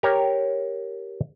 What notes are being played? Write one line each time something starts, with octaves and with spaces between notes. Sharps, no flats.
G4 A#4 C#5